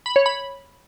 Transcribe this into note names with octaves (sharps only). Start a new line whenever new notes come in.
B5
C#5
B5